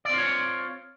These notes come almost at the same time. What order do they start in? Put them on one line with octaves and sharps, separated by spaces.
D5 C4 F4 C#5